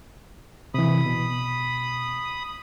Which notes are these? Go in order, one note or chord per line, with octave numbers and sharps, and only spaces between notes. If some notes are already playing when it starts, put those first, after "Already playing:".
C3 E3 B5 D#6
B2